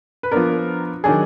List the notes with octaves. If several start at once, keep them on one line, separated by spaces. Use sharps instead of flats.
B4
F3 B3 D4 A#4
D#3 F#3 D4 G#4